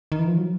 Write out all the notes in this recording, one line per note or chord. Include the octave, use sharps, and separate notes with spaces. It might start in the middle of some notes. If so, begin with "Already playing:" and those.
D#3
E3
F3
F#3